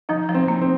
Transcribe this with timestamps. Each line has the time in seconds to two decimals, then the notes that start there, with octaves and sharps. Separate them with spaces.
0.09 F3 D#4
0.29 F3
0.34 C4
0.48 A#3
0.61 C4